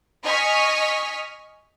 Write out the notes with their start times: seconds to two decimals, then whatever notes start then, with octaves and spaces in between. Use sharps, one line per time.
0.23 D#5 G#5 C#6 F6 B6